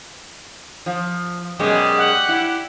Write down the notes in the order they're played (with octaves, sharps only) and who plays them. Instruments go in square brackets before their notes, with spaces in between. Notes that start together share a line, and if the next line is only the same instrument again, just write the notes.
[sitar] F3
[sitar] F#2 B2 G#3 [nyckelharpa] G4 D5
[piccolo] F#5
[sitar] E4